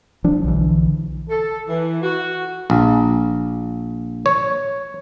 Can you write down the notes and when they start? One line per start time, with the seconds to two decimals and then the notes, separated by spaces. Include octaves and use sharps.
0.24 F3 D4
0.44 B1 D3 E3
1.28 A4
1.68 E3
2.02 F#4
2.70 A#1
4.26 C#5